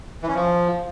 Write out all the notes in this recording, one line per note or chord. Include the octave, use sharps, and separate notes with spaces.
E3
C#4
F3